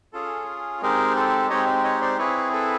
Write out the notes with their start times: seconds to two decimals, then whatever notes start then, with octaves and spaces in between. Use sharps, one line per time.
0.13 C#4 F4 G#4 A4
0.82 G#3 C4 D#4 G4 G#4 A#4
1.16 A4
1.50 G#3 C4 D#4 G4 C#5 D#5
1.84 C#5 D#5
2.02 C5 D5
2.18 C4 E4 G#4 B4 C#5
2.53 A4 B4